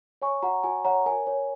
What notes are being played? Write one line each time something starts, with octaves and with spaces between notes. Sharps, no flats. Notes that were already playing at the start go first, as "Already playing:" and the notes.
C#5 G#5 C#6
F#4 F#5 A#5
F#4 G#5
C#5 F#5 A#5
A#4 G#5
C#5